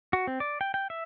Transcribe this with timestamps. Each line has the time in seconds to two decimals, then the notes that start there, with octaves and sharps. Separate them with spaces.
0.13 F#4
0.27 C4
0.40 D5
0.61 G5
0.74 G5
0.90 E5